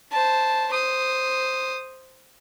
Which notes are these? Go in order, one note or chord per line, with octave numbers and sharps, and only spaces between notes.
C5 A5
C5 D#6